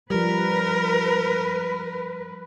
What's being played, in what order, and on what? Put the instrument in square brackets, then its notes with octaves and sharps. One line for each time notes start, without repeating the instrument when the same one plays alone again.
[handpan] F3 G3 [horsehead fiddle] A#4 [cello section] B4